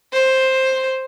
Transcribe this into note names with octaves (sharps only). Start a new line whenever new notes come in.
C5